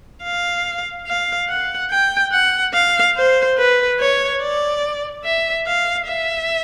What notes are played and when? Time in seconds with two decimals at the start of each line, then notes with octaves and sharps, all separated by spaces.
0.23 F5
1.07 F5
1.49 F#5
1.90 G5
2.32 F#5
2.73 F5
3.16 C5
3.57 B4
3.99 C#5
4.41 D5
5.24 E5
5.67 F5
6.08 E5